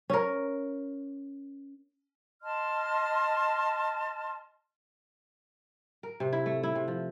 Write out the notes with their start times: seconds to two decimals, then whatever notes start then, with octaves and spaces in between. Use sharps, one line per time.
0.10 C#4 A#4
2.42 D#5 A5 C6 F6
6.03 A#4
6.20 C3
6.33 E4
6.46 A3
6.63 E4
6.75 C3
6.88 F3